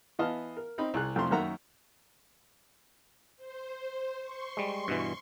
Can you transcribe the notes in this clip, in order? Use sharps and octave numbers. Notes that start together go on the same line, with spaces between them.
E3 B3 D#5 F5 A5 F6
A#4
C4 D#4 B5
C2 G#4 F#6
C2 F2 A3 C4 A#5 C6
F#2 D#3 A#3 E5 F#5 A#5
C5
C6 C#6
G3 G#3
G2 B2 E3